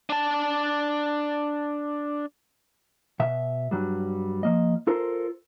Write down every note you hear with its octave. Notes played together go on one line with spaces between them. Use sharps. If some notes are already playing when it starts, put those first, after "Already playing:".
D4 A5
B2 E5
G2 F#3 G3
F3 A#3 D#5
F4 A4 A#4 C5